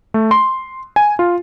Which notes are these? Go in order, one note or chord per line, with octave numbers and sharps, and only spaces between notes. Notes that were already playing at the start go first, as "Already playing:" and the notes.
A3
C6
G#5
F4